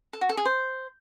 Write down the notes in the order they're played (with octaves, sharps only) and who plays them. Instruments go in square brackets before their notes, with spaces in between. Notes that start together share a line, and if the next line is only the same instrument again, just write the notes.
[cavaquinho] A4
F#4
A4
G#4
C5